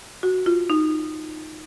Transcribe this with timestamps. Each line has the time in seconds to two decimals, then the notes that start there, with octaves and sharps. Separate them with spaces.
0.23 F#4
0.46 F4
0.70 D#4